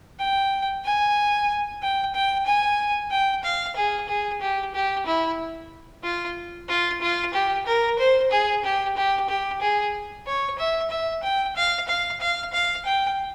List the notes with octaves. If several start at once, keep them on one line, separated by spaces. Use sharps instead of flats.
G5
G#5
G5
G5
G#5
G5
F5
G#4
G#4
G4
G4
E4
F4
F4
F4
G4
A#4
C5
G#4
G4
G4
G4
G#4
C#5
E5
E5
G5
F5
F5
F5
F5
G5